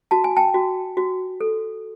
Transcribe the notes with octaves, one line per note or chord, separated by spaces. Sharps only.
F#4 A5
G#5
G5 A5
F#4
F#4
A4